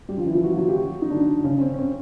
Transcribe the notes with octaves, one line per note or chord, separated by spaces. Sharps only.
G3 G4
F3 F4
E3 E4
F3 F4
F#4
F4
F#3 F#4
G4
F#3 F#4
D#4
D3 D4
C#3 C#4
C#4
C4
C#4
C4